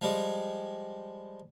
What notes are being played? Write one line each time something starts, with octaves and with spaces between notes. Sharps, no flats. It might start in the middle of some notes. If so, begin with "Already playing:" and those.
F3 G3 G#3